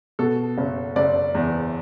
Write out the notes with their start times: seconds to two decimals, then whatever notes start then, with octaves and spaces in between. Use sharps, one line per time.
0.19 B2 A4
0.58 F#1
0.96 F#1 D5
1.35 E2